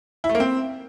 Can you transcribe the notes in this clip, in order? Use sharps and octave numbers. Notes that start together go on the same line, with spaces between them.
E4
A3
A#3
C4